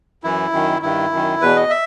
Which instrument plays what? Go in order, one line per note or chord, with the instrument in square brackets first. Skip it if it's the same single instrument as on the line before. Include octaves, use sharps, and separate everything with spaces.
[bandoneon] F#2 E3 E4
F#2 D#3
G2 D#3 E4
F#2 D#3
E2 B2 B4
D#5
E5